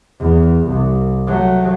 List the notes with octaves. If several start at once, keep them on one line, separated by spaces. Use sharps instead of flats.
E2
C2
F#3 A3